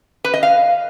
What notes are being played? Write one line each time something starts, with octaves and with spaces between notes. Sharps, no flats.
B4
D#5
F5